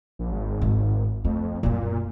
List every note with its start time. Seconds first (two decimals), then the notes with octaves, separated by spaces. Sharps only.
0.19 A#1
0.32 G#1
0.62 G#2
1.25 F2 A3
1.63 F#2 A#2 G3